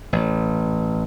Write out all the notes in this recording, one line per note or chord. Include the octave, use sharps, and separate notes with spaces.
A1